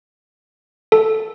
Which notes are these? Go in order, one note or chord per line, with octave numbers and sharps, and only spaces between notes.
A4